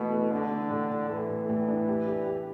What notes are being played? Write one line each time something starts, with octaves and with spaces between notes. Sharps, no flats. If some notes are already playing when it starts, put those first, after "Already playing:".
Already playing: B2 E3 A3
A3
D3 A3
D4
A2
A2
E3 A3
A2
A2
D4
G4
G4
G4